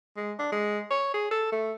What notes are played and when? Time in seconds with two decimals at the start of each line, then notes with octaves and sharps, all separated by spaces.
0.16 G#3
0.39 D4
0.52 G#3
0.90 C#5
1.14 G#4
1.31 A4
1.52 A3